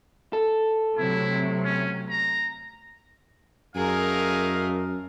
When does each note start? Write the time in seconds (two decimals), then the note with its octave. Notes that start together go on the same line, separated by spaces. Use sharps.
0.33 A4
0.98 C3 F#3 A3 E4
1.65 C#4
2.09 A#5
3.76 F#2 A3 G#4 A#4 D#5 F5